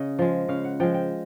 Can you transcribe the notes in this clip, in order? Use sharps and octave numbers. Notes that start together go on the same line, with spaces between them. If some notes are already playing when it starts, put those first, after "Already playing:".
Already playing: C#3 D#5
F3 G#3
C#3 F5
F#5
F3 G#3 G5
G5